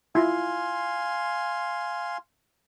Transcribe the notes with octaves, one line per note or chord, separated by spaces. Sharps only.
E4 F4 F5 G#5 C6